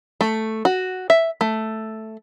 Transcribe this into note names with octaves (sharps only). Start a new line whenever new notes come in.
A3
F#4
E5
A3